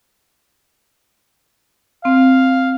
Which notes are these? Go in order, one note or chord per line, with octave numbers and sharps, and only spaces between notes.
C4 F5